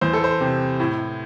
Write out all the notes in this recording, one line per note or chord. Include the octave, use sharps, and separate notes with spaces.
E2 C5
A4
C5
C3
A2